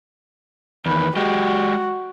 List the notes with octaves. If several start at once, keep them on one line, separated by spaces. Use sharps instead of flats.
E2 D#3 B4
G#3 F#4 G4